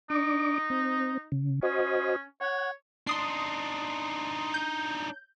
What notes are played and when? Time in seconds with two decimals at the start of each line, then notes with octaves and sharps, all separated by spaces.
0.10 D4 D#4 D6
0.70 C4
1.32 C#3
1.63 C#4 F#4 C5 D#5
2.41 C#5 F#5
3.07 D4 D#4 C6 D#6 C7
4.54 G6